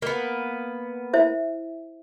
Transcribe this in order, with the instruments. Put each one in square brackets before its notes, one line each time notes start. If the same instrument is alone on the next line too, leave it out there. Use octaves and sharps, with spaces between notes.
[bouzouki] A#3 B3
[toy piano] E4 C5 E5